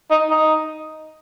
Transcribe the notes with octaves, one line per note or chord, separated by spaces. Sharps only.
D#4
D#4